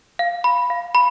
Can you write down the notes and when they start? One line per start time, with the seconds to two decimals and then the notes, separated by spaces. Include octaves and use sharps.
0.19 F5
0.44 B5
0.70 F5
0.95 B5